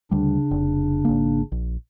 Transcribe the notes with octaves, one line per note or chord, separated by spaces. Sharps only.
D2 C#3 G3 D4
F1
G#1 A#3
A#1